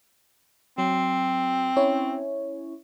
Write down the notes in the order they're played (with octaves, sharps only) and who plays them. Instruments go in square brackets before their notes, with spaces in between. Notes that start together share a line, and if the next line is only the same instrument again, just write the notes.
[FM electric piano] F#3 [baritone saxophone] C4
[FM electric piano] C#4 E4 C#5